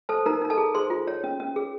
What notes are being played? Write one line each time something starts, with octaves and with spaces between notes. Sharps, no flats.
A4 C5 A5
D#4 A#4 A#5
D#4 A#5
A4 A5
G#4
G#4 C5 C6
F4
C#5
C#4
C#4
G#4